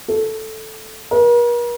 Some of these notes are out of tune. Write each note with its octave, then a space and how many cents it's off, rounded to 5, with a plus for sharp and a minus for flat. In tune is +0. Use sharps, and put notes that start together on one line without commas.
A4 -5
A#4 +45